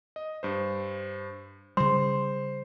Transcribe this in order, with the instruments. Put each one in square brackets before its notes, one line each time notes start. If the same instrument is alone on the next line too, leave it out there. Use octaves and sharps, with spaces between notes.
[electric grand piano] D#5
G2 C5
[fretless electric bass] C#3 G3 [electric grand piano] C5 [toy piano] C6